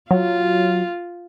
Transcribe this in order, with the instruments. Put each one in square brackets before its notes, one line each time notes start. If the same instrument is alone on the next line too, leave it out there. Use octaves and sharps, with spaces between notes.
[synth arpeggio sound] F#3 [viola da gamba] F4